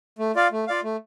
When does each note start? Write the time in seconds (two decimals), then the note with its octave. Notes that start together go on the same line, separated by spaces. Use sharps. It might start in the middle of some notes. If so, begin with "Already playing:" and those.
0.19 A3
0.35 F4 D5 F5
0.52 A3
0.67 F4 D5 F5
0.83 A3